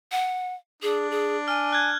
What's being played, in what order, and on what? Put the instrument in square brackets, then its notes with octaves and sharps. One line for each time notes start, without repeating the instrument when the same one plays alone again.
[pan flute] F#5
[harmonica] D4 [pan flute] G#4
[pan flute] G#4
[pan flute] G#5 [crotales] F6
[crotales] F#6 G#6